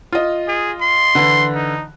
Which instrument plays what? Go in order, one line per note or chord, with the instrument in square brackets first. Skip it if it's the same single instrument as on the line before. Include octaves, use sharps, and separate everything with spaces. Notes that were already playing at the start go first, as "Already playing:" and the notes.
[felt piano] F4 D#5
[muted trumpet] G#4
C6
[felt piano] D3 E3
[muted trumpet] D#4